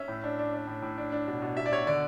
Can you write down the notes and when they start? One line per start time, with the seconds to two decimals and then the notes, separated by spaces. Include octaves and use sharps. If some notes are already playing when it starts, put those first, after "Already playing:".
Already playing: C#4 E5
0.08 A2
0.24 D4
0.39 D4
0.54 D4
0.67 A2
0.82 A2
0.98 D4
1.12 D4
1.27 B2
1.42 B2
1.57 B2 E5
1.66 D5
1.72 B2 C#5
1.87 D3 D5